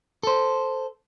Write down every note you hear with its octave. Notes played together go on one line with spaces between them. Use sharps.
A4 C5